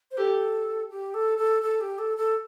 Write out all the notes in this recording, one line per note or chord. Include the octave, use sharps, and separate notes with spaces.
C5
G4 A4
G4
A4
A4
A4
G4
A4
A4